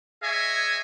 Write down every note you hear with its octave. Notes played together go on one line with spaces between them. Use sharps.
G#4 C#5 D#5 E5 G#5